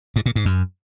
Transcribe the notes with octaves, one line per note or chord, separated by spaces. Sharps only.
G#2
A#2
G#2
F#2